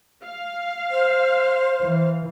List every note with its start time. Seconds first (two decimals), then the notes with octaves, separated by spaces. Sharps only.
0.24 F5
0.91 C5
1.82 E3